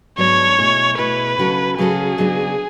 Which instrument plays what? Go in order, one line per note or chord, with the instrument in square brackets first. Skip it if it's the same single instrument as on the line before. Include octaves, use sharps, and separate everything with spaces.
[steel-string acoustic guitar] G#2 F#3 B3 D4 A4 [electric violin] C#5
[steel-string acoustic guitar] B2 A3 E4 G#4
[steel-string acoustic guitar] B2 A3 E4 G#4 [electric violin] B4
[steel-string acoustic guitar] C#3 F#3 C#4 F#4 A4
[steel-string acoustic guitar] C#3 F#3 C#4 F#4 A4 [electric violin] G#4
[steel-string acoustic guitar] C#3 F#3 B3 D4